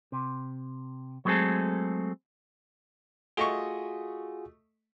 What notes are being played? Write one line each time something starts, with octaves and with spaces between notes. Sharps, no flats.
C3
F#3 G#3 A3 C4 G#4 A4
A3 F4 F#4 G#4 D#5 C#6